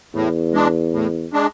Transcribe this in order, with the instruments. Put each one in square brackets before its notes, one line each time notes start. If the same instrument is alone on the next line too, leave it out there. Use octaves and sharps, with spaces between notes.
[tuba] E2 [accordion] A2
[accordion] G#3 D4
A2
G#3 D4